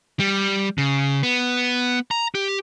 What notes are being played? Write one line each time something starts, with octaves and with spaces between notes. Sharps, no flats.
G3
C#3
B3
A#5
G4